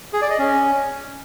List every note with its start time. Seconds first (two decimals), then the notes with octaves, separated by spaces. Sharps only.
0.13 G#4
0.22 D5
0.30 D#5
0.38 C#4